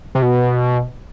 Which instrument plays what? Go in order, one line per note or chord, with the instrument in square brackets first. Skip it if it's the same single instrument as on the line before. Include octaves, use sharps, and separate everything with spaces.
[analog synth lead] C3
B2